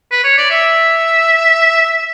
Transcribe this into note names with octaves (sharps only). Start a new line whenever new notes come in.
B4
C#5
D5
E5